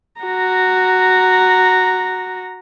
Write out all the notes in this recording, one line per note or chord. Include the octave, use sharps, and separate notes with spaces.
F#4 A#5